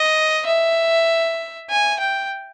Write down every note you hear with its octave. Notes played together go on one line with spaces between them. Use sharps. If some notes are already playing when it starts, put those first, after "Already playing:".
Already playing: D#5
E5
G#5
G5